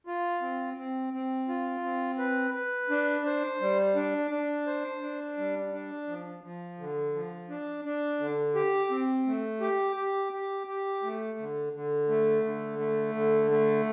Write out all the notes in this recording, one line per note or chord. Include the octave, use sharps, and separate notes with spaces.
F4
C4
C4
C4
F4
C4
B4
B4
D4
C5
G3
D4
D4
C5
D4
G3
D4
F3
F3
D3
F3
D4
D4
D3
G4
C4
A3
G4
G4
G4
G4
A3
D3
D3
A3
D3
A3
D3
A3